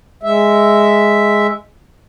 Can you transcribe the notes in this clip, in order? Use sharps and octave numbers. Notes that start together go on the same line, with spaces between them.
G#3 E5